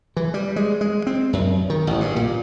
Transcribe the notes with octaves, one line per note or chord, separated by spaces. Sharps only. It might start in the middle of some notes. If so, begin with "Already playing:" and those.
E3
G3
G#3
G#3
C4
F#2
D#3
A1
G2
A#2